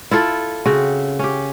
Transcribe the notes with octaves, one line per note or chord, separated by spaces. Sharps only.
E4 F4 A4
C#3 C4 F#4
C#4 G4